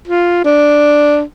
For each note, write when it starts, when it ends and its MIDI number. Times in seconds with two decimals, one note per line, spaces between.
0.07 0.44 65
0.44 1.22 62